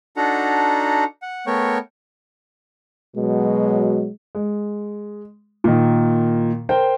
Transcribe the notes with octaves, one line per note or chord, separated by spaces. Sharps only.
D4 D#4 F#4 A4 F#5 A#5
F#5
A3 B3 A#4 C#5 G5 C#6
B2 F#3 G#3
G#3
A#2 D#3
A#4 C5 G5